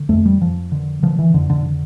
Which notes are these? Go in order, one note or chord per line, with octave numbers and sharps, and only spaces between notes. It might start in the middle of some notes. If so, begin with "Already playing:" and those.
Already playing: D3
F2 A3
G3
F2 F3
D3
D3 F3
E3
F2 D3
D3
D3